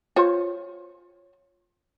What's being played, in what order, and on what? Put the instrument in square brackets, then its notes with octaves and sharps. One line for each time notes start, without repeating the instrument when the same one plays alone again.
[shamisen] F4 C5 C#5